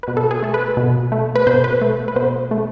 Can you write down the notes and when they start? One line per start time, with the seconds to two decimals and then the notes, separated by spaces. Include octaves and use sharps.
0.03 B2 B4
0.17 A4
0.31 G#4
0.42 A3 A4
0.54 B4
0.77 B2
1.12 A3
1.35 B4
1.47 B2 C5
1.64 B4
1.81 A3
2.08 B4
2.16 B2 C5
2.51 A3